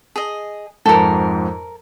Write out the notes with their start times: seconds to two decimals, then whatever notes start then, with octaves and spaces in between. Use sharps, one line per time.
0.16 G#4 D#5
0.86 F2 G#2 A4 A#4